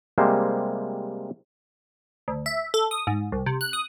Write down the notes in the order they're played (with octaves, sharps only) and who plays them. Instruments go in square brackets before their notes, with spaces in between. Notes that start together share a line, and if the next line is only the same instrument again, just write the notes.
[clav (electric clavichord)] C3 G3 G#3 A#3 C5
[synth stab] D2
E5
A4
D#6
G#2
C2
C3
F#6
D#6